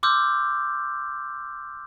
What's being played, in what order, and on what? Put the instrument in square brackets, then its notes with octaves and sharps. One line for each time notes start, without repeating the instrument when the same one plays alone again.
[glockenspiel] C6 D6 E6 F6 G6